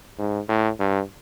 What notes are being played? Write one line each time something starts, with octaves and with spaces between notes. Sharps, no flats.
G#2
A2
G2